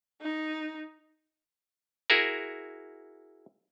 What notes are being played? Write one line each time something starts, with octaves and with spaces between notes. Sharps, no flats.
D#4
E4 F#4 G#4 A#4